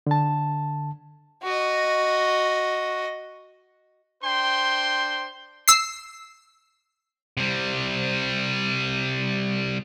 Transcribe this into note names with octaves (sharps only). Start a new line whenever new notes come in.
D3 A5
F#4 D#5
D4 C5 G5 C6
E6 C7
C3 G3